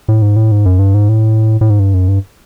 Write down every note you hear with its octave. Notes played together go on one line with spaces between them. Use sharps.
A2
G#2
A2
G#2
F#2
G2
G#2
A2
A2
G#2
G2
F#2
G2